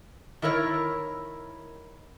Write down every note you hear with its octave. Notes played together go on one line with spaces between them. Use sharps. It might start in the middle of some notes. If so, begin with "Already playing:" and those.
D#3 E4 A#4 C#5